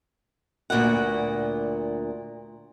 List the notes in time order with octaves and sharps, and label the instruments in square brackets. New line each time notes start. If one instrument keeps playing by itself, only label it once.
[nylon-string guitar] D2 A#2 B3 F#5